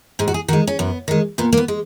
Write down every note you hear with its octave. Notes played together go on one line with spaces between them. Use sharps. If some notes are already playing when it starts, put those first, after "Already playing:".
G#2 G#4
F#4
G#4
D#3 G#3 F#4
C#4
F#2 B3
D#3 G#3
A#2 B3
A#3
B3
G#3